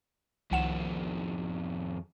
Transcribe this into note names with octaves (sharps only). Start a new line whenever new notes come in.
C2 F2 D#3 F#5 E7